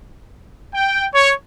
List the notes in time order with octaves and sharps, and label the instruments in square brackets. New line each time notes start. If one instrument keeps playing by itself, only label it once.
[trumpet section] G5
C#5